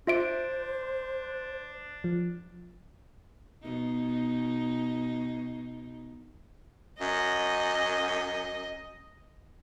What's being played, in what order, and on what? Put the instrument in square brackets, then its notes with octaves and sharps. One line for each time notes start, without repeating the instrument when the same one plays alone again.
[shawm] D4 [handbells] F4 E5 D7 [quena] C5
[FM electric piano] F3
[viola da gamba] B2 D#4
[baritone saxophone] F#2 [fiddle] D#5